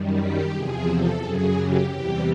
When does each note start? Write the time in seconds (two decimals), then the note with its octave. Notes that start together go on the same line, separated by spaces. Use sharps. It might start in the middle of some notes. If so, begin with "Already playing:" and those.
Already playing: F#2 D#3 G3
0.18 G4
0.52 E2 C3 F3 G#4
0.87 A4
1.21 F#2 C#3 F#3 G#4
1.55 G4
1.90 E2 C3 E3 G3 G4